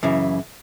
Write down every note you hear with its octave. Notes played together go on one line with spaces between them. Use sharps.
F#2 C#3 E3